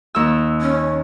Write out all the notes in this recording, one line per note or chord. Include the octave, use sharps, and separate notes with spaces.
D#2 E6
C#4